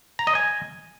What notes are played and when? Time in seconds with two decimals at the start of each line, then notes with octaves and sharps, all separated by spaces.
0.19 A#5
0.27 D#5
0.35 G#5